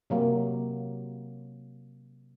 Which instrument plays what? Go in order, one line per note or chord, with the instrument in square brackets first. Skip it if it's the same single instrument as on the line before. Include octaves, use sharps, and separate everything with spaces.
[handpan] C3 F#3 A#3